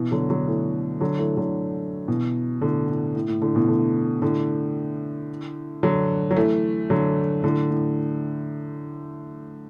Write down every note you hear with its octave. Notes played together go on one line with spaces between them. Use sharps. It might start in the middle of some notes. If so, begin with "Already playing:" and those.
Already playing: B2 E3
D3 F#3
D3 F#3
E3 A3
D3 F#3
E3 A3
D3 F#3
B2 E3
A2 D3
A2
A2
A2
A2 D3
B2 E3
A2 D3
A2 D3
D3 F#3
F#3
E3 A3
D3 F#3
A2 D3
A2